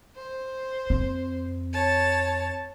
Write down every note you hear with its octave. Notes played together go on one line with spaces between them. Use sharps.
C5
F2 C4
C#5 A5